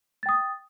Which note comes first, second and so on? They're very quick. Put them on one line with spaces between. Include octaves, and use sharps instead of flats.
A6 G5 D#6